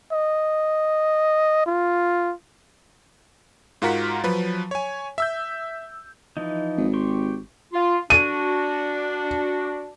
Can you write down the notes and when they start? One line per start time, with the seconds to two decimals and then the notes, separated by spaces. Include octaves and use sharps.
0.12 D#5
1.66 F4
3.82 G#2 F4 F#4 A#4 F#5 B6
4.24 F3 F#3 B4
4.71 C#5 G#5
5.18 E5 E6 G6
6.37 E3 F3 D#4
6.78 G#1
6.93 G4 C6 C#6
7.73 F4
8.10 D4 F#4 D#7